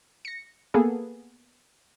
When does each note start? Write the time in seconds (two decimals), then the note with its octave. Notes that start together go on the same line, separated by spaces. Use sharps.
0.25 A#6 C#7
0.74 A#3 B3 G#4 A4